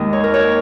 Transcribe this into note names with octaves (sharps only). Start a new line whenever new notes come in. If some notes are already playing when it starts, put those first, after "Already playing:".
Already playing: D#2 D#3 G#3 D#5
C#5
A#4
C#5